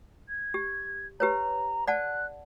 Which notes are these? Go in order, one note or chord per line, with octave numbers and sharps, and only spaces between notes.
G#6
G4
G4 B4 C#5 A#5
D5 F#5 A5 F#6